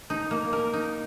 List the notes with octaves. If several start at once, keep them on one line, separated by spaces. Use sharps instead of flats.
D#4
A#3
A#4
D#4